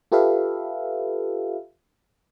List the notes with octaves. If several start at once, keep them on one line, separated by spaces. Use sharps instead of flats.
F4 G4 A4 B4 E5 F5